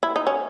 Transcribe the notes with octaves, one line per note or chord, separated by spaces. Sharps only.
E4
D#4
C#4